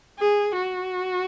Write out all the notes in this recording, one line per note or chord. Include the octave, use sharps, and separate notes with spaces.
G#4
F#4